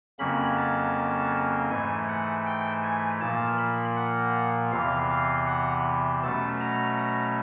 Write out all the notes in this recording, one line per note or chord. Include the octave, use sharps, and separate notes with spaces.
F2 C#3 F#3 A#3 C#4 B5
A5
G#2 E3 A3 G#5
F#5
G5
G#5
A#2 F3 A#3 A5
B5
F#5
E2 C3 E3 F5
F5
F#5
B2 F#3 A3 C#4 A5
A#5
A#5